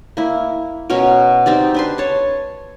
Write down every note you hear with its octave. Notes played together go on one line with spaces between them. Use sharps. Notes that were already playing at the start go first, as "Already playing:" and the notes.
A#3 E4
B2 C#4 F#4 A#4
C4 D#4 G4 D5
D4 B4 C6
C#5 A5